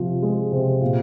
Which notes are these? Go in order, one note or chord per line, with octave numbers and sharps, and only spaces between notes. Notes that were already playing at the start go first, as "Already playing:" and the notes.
Already playing: C3 F3
G#3
C3
A#2